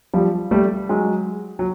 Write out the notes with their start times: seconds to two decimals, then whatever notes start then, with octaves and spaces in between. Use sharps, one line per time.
0.14 F3 G3
0.51 G3 A3
0.89 F#3 G#3
1.59 F#3